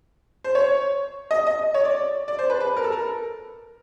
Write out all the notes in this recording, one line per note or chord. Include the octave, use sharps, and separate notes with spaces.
C5
C#5
D#5
D#5
C#5
D5
D5
C5
B4
B4
A#4
A4
A#4